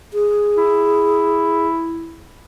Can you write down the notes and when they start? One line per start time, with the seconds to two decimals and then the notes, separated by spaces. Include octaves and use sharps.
0.13 G#4
0.57 E4